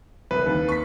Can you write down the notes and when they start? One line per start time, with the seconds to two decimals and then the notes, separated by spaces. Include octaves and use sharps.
0.31 C2 B4
0.46 D#2
0.68 C#6 B6